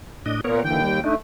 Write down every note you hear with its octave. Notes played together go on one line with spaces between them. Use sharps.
A2 D4 D#5
A#2 B3 A#4 C#5
D#2 D3 E3 G5
G3
A3 D4 D#4